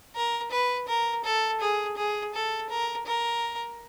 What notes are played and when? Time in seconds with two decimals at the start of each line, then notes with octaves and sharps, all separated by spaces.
0.16 A#4
0.51 B4
0.88 A#4
1.25 A4
1.61 G#4
1.97 G#4
2.34 A4
2.70 A#4
3.06 A#4